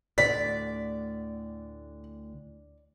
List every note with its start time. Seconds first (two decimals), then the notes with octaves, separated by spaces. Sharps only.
0.18 D2 A2 D3 D5 B6